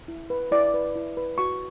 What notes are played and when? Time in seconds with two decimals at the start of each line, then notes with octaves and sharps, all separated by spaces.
0.08 E4
0.30 B4
0.52 E4 D5
0.74 B4
0.96 E4
1.17 B4
1.38 F#4 C#6